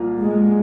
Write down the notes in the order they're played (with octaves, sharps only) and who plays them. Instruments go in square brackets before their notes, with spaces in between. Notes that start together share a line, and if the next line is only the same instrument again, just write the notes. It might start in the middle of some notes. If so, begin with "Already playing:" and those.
Already playing: [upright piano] C2 A#2 F3 A#3 F4
[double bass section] G#3